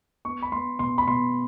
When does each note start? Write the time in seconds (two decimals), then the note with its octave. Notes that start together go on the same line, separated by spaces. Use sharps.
0.25 B3 C#6
0.42 B5
0.52 B3 C6
0.79 B2 C6
0.98 B5
1.07 B2 C6